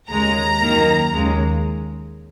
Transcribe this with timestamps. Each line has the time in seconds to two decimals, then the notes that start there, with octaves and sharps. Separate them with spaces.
0.10 D#2 C#3 G#3 A#5
0.61 F#2 D#3 A#3
1.13 D#2 C#3 G#3